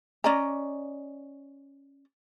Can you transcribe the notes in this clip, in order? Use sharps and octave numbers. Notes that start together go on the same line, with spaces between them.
C#4 D5 D#5 A#5